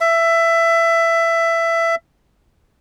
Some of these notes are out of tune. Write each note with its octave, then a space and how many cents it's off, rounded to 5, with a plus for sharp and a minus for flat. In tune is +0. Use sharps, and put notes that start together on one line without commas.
E5 +15